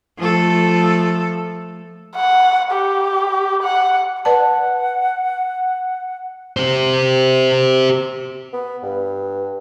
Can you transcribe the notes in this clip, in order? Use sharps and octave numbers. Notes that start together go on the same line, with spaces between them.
F3 A3 A4
F#5
G4
F#5
B4 D5 F#5 A5
G4 C5
B3
G2